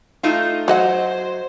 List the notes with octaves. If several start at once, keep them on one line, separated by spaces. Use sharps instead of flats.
A3 D#4 F4
F#3 F#4 C5 D#5 F#5